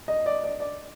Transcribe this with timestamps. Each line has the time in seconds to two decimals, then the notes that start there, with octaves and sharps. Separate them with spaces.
0.08 D#5
0.26 D5
0.44 D5
0.60 D5